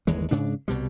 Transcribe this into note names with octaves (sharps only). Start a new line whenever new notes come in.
G1 D#2 E3 G#3
G#2 C#3 D4
C2 B2 G3